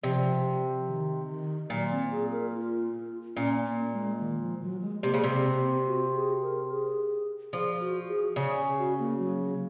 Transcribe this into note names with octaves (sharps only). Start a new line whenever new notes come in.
C3 F3
D#3
D#3
A#2 F#3
C4
G#4
A#4
F4
A#2 C#4
A#3
G#3
D#3
F3
F#3
G#3
C3 A#3
C#3
C3
C4
C4
F#4
G#4
A#4
G#4
F3 G#4
F#4
G#4
C#3 G#4
F#4
A#3
F#3
F#3